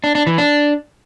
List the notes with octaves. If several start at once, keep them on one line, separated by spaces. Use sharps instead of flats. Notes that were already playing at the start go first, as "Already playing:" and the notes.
D4
D4
E3
D4